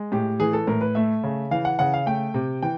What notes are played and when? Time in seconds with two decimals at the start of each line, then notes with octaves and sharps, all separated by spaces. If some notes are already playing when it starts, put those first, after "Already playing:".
Already playing: G#3
0.12 A2 G4
0.40 E3 G#4
0.53 A4
0.67 A2 A#4
0.81 B4
0.95 A3 E5
1.24 C#3
1.51 E3 F5
1.65 F#5
1.79 C#3 F#5
1.94 F5
2.06 A3 G5
2.34 C3
2.62 E3 G5